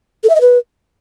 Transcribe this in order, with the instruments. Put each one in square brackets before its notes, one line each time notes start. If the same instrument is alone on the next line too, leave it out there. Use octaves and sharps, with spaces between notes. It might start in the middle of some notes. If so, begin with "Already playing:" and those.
[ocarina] A4
E5
D#5
B4